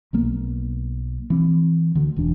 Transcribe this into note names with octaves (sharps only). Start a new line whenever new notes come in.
B1 F#3 A#3 B3
E3 C4
D2 D3
E1 E3 D4